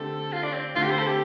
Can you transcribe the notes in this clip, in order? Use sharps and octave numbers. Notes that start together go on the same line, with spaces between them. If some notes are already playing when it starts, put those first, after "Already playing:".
Already playing: D3 A3 C4 G4 A4
F4
D4
C4
D3 A3 C4 F4
G4
C5
A4
G4